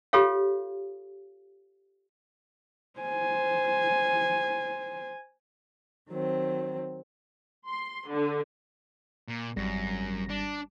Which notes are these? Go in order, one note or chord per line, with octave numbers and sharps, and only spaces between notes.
F4 G4 A4 C#5 F5
C5 G#5
D#3 F#3 C4
C6
D3
A#2
G#1 F#2 G3 A#6
D4